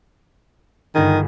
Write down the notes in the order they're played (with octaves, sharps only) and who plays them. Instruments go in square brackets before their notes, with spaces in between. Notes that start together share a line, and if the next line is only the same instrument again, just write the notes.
[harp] G1 G#4 [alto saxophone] D#3